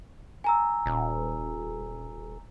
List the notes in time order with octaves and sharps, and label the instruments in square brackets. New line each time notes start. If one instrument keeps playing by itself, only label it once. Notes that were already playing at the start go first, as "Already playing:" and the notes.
[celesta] G#5 A#5 E6
[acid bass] D#1